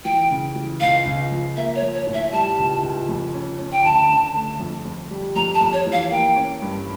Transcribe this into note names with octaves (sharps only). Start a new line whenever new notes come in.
E3 G5
C#3
E3
C#2 F5
C#2
F3
A#3 E5
C#5
F3
C#5
A2
E5
G3 A5
C#2
C#2
F2
C#4
C#4
G5
D2 A5
D3
A3
F2
F2
G3
F2 A#5
A5
F2
C#5
E3
F5
A#3 G5
C#4
G2